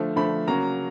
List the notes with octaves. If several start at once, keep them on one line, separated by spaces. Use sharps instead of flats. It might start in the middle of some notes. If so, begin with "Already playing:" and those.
Already playing: D3 F3 A3
D3 F3 A3 B5
C#3 F#3 A#3 A#5